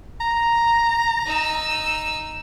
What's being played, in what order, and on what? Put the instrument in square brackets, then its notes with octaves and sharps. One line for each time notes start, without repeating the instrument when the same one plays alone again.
[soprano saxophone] A#5
[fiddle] D#4 E6